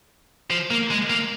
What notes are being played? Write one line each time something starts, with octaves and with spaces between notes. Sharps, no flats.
F3
A#3
G#3
A#3